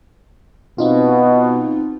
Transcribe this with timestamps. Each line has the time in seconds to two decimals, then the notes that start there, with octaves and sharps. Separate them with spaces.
0.78 B2 C4 D#4 F4